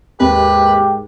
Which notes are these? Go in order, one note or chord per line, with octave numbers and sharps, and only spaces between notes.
D#2 G#2 G4 B4